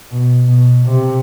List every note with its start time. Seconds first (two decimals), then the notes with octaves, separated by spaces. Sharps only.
0.11 B2
0.48 B2
0.86 C3